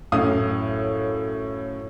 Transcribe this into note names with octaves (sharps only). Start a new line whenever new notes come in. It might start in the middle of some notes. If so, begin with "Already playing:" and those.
F#2 A2 F5 D#6